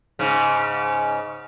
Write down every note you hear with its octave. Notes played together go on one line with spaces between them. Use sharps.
G#2 C#3